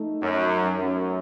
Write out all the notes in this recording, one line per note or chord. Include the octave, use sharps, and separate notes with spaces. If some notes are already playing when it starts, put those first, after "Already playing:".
Already playing: A3 D#4
F#2
F#2